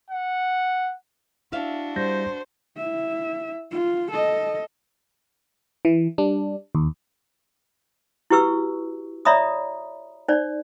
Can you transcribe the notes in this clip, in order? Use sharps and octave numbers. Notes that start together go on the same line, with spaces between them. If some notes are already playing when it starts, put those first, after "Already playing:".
F#5
D4 E4 F#4 E5 F5
G3 C5 G6 A#6
E4 E5
F4
A4 D#5
E3
G3 D4
D#2
E4 F#4 G4 B4 C#6 E6
C#5 D5 E5 A#5 B5 D#6
D#4 C5 D5